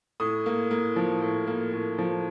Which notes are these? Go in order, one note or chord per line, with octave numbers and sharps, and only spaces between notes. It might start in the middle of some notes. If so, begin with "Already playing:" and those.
A2 D#6
A#3
A#3
F3
A2
A#3
A2
F3